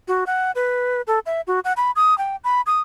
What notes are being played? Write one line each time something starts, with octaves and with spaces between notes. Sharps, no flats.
F#4
F#5
B4
A4
E5
F#4
F#5
B5
D#6
G5
B5
D#6